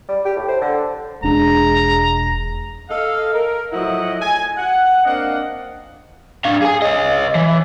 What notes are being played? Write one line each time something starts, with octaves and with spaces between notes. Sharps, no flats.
G3
G4
A2
C5
D3
E1 G#3 D4 A#5
A4 D#5 F5
A#4
A2 F3 F#3 E4 D#5 F#5
G#5
F#5
A#3 C4 D4 D#5 F5 F#5
D4 F5
G#4 G#5
C#5 D#5
E3